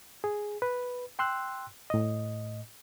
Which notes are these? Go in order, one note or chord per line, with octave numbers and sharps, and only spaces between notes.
G#4
B4
G5 C6 E6 F#6
A2 D#5